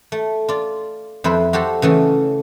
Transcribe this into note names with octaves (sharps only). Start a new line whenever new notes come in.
A3
F4 D5
F2 E4 B4 C5
F#4 G4 A4 C5
C#3 E3 A3 C#4